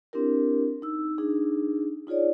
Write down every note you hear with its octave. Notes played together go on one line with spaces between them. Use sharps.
C4 D4 E4 G4 A#4
D#4 E6
D4 D#4 G#4
D#4 F4 G#4 C#5 D5